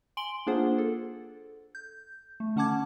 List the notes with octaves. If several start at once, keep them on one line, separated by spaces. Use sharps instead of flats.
G#5 C6 D7 F#7 G7
A#3 D4 F4 G#4 C5 F#5
A4
G6
A3
D3 C#4 F#5 A5 D6 G#6